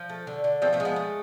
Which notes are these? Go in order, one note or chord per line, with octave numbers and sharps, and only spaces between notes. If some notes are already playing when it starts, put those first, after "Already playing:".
Already playing: F3
A3
D3
D3
F3 A3 C4
A3 C4
G#3
B3
A3